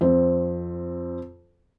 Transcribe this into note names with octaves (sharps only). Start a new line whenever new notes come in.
F2 C4